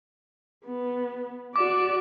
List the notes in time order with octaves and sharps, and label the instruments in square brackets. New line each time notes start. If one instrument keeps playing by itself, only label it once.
[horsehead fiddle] B3
[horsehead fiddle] F#4 D5 [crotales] D6